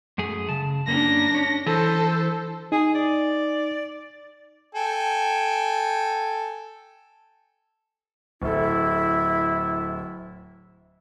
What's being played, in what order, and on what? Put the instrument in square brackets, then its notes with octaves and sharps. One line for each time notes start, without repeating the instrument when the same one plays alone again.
[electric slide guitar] F#2 A3 G#4
C#3 A5
[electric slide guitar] F#2 A#3 C#4 [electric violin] D4 A#6
[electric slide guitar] C#4
[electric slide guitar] E3 [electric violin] A4 C5
[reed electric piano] D#4 [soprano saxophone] G#4
[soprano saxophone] D5
[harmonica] A4 G5 G#5
[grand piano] D1 A4 [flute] E4